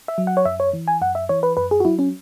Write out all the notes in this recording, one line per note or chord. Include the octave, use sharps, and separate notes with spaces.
E5
F#3
F#5
C#5
F#2 E5
C#5
E3
G#5
F#2 F#5
E5
E3 C#5
B4
F#2 B4
G#4
F#4
F#3 E4
C#4